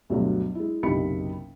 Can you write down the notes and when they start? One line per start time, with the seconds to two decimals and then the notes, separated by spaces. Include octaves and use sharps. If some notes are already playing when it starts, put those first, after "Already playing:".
0.10 D2 G2 B2 F#3
0.55 G#3 E4
0.83 F#1 B1 C3 D#5 B5 C#7